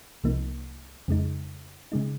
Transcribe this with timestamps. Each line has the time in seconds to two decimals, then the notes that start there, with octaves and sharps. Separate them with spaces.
0.24 C2 C3 F3 A#3 D#4
1.08 F2 C#3 G#3 D#4
1.92 C#3 G#3 D#4